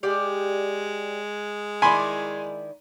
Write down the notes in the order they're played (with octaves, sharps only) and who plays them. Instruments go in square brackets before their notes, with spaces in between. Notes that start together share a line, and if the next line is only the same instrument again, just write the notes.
[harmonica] G#3 [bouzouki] G4 D5 F5
[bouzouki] D#3 E4 D5 [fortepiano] G#5 B5 C6